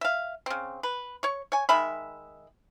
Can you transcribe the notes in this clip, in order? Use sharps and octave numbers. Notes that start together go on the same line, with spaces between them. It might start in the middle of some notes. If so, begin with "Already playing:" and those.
E5 F5
C#3 C4
B4
C#5 C#6
C#5 G#5
D#3 G#3 E5 B5